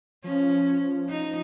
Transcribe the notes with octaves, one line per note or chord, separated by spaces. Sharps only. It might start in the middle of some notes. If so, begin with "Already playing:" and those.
F3 C#4
D#4